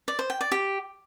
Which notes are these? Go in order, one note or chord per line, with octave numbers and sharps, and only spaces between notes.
D5
C5
G5
D5
G4